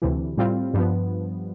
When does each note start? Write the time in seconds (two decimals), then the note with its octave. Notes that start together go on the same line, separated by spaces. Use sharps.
0.02 D2 C3 E3
0.37 A2 G3 C4 F4
0.74 G2 F3 B3